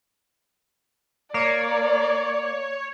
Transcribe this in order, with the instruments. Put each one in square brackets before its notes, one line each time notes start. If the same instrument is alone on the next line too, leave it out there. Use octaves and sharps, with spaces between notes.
[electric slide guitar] A#3 [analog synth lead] C#5 [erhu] D5